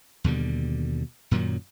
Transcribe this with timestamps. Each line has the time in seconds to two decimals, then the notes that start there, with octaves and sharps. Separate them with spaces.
0.24 D#2 B2 D3 G3
1.31 F#2 A#2 D#3 F#3